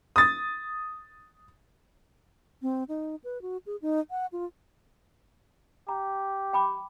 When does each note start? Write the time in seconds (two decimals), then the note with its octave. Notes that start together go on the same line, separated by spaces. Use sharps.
0.16 D#6 A6
2.62 C4
2.88 D#4
3.24 B4
3.42 F#4
3.66 G#4
3.82 D#4
4.11 F#5
4.33 F4
5.89 G4 A#5
6.53 G5 B5 D6